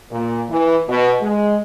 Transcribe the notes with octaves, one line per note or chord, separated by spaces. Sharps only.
A#2
E3
B2
G#3